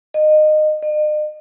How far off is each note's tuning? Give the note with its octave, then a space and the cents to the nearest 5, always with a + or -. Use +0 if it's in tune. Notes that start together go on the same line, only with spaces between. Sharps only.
D#5 -20
D#5 -45